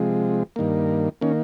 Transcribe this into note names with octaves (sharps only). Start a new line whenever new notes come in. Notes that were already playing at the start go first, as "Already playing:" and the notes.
Already playing: C3 F3 G#3
G2 D#3 A#3
D#3 A#3 C#4